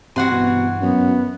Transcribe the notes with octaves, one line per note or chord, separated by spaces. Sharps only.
G2 C3 E3 F#4 F#5 C6
B2
F#2 B3